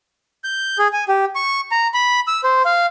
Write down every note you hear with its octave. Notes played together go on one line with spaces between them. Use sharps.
G6
G#4
G#5
G4
C#6
A#5
B5
E6
C5
F5